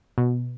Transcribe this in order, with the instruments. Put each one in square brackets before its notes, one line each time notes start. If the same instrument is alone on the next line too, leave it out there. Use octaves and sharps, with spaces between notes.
[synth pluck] B2